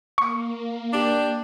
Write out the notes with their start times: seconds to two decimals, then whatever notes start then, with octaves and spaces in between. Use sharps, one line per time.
0.18 A#3 C#6
0.93 D4 G4